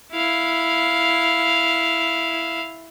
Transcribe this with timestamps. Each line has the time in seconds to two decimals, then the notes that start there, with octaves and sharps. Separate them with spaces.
0.12 E4 F5